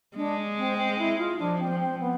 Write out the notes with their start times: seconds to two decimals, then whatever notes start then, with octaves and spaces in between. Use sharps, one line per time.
0.16 G#3 D4
0.58 C4
0.78 C4
0.98 E4
1.19 F4
1.39 F3 D4
1.59 C4
1.70 F3
1.80 C4
2.00 B3